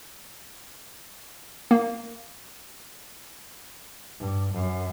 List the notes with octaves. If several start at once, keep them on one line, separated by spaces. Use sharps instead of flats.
A#3
G2
F#2